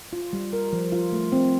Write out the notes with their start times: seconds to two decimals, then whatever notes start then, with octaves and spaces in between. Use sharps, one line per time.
0.13 F4
0.33 G3
0.53 A#4
0.73 F3
0.92 F4
1.13 A3
1.32 C4